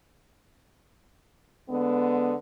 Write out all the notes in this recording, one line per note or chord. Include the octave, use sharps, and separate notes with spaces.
D3 G#3 B3